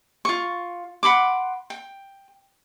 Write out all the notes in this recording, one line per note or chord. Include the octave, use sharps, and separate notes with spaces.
F4 C#6
F#5 B5 C6 D6
G5